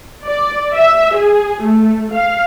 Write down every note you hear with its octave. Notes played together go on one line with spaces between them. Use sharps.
D5
E5
G#4
A3
F5